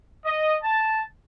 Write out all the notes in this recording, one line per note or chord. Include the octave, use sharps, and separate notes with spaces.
D#5
A5